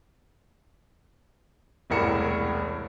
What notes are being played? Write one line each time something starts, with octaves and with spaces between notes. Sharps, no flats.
E1 C2 A2 A#4 C#7 E7